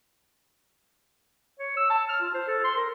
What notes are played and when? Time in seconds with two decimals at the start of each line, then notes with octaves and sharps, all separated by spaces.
1.60 C#5
1.77 E6
1.90 A5
2.09 F6
2.21 F4
2.34 C5
2.48 A4
2.64 C6
2.76 A#4